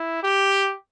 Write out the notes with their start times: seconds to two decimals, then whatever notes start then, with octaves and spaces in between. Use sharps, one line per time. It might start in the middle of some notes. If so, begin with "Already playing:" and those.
Already playing: E4
0.23 G4